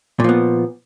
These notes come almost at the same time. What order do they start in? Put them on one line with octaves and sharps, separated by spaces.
A#2 F3 B3